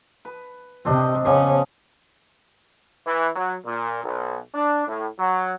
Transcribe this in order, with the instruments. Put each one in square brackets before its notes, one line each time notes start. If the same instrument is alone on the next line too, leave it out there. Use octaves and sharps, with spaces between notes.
[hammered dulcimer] B4
[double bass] C3 [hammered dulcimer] C4 D4 D#5
[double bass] C#3 C#4 [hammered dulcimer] F3 B3 D4
[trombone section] E3
F#3
A#2
B1
D4
A2
F#3